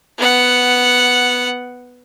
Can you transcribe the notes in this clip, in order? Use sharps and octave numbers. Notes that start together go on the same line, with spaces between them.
B3 F#5